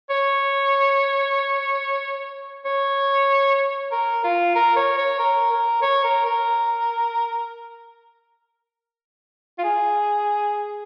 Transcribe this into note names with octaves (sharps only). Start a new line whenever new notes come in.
C#5
C#5
A#4
F4
A#4
C#5
C#5
A#4
A#4
C#5
A#4
A#4
F4
G#4